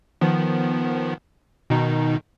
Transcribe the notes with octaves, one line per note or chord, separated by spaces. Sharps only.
D#3 F3 B3
B2 D#3 D#4